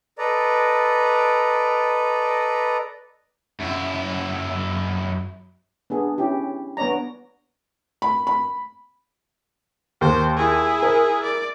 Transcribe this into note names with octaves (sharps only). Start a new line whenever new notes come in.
A4 B4 D5 D#5 A#5
F#2 E4
B3 D4 G#4
C#4 E4 G4
B3 D4 C#5 D5 A#5
B5
B5
D#2 C5
E4 G#4
A#4
D5